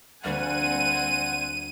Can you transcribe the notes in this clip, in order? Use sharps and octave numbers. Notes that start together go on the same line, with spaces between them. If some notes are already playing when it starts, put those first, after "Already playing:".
D2 G3 A#3 C4 F5 F#5 G#5 D#7